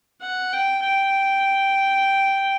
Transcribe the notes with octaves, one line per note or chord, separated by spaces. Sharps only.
F#5
G5
G5